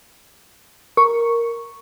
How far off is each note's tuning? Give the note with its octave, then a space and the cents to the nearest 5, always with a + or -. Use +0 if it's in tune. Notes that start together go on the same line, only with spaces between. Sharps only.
A#4 +0 C#6 +0